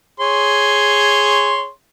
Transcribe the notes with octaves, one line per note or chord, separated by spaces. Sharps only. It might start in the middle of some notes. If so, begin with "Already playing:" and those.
G#4 C#5 C6